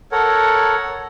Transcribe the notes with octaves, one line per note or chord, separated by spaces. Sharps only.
A4 A#4 C#5 F#5